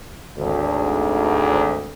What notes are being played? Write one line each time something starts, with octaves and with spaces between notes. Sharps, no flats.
G#1 D2